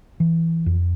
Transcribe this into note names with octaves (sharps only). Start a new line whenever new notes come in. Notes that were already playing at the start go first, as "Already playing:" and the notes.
E3
F2